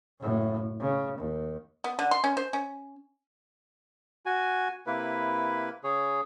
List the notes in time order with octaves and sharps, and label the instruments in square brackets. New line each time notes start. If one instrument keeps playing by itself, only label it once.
[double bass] F#1 A2
C#3
D#2
[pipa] B3
D3
C6
C#4
C5
C#4
[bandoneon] F#4 G#5
C3 A#3 E4 B4
C#3 G#4 C#5